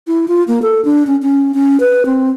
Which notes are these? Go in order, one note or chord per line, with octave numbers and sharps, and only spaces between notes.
E4
F4
A#3
A4
D4
C#4
C#4
C#4
B4
C4